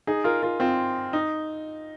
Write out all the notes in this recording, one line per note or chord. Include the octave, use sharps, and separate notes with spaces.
D#4 G#4
F4 A#4
F4 A#4
C4 F4
D#4